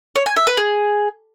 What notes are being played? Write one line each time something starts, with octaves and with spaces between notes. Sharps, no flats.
C#5
G#5
E5
B4
G#4